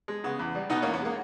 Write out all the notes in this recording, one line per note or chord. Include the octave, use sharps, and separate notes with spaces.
G#3
C#3 B3
E2
G3
B2 B3 D#4
A#3 C#4
E2
B3
G#3 A#3